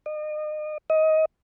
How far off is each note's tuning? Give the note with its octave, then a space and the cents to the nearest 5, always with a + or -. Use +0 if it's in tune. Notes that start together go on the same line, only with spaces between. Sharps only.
D#5 -35
D#5 +20